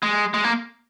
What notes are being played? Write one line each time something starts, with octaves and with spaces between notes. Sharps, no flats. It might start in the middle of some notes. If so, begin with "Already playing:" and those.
G#3
G#3
A#3